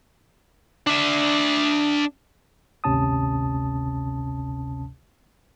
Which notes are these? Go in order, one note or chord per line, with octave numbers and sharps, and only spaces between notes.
D4 E5
G#1 D2 C3 C#4 A5 D#6